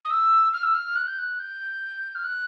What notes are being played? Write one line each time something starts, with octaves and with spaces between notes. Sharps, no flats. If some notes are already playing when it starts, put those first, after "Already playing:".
D#6
E6
F6
E6
F6
F#6
G6
F#6
G6
F6
F#6